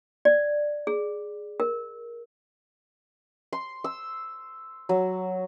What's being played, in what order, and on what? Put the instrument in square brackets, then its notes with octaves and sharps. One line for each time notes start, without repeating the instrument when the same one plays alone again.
[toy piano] D5
G#4
A#4
[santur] C6
E6
F#3